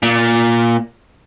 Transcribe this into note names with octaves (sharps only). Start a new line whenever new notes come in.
A#2